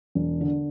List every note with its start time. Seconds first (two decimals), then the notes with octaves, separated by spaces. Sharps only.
0.15 E1
0.41 D3